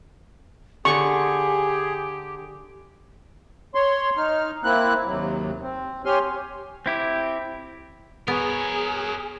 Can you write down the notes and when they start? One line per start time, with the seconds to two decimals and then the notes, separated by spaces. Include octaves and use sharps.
0.85 D3 G4 G#4 C#6
3.75 C#5 C6
4.17 D#4 F6
4.64 A#3 C4 E4 F#6
5.05 D#2 C3 F#3
5.62 C4
6.05 G4 C#5 G#5 C6 F6
6.86 C4 E4 G4
8.28 B3 G#4 A#4 C#5